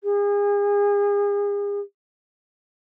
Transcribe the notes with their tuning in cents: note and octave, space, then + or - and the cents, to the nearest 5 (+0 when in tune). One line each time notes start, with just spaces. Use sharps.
G#4 -35